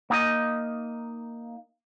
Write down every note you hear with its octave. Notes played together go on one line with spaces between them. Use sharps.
A#3 D#4 D#5